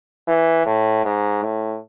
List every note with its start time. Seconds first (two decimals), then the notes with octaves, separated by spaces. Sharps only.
0.28 E3
0.66 A2
1.05 G#2
1.43 A2